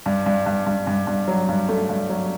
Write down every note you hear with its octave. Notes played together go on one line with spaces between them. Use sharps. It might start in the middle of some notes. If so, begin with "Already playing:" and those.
G2
G2
G2
G2
G2
G2
F#3
G2
A3
G2
F#3